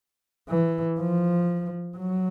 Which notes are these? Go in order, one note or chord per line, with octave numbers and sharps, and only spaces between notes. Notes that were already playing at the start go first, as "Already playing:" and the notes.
E3
F3
F#3